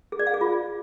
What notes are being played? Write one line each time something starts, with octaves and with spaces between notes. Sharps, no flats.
G#4
D5
F5
G#4
F4